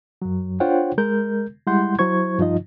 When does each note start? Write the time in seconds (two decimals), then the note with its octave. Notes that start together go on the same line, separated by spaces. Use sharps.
0.22 F#2 F#3
0.60 D4 F4 C5 C#5 F#5 G5
0.98 G#3 A#4 G6
1.67 G3 G#3 E4 F#5 C6 G6
1.99 F#3 E4 C5 C#6 G#6
2.39 G2 F3 D#4 F4 D#5